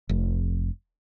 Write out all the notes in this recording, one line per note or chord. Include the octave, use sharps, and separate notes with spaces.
F1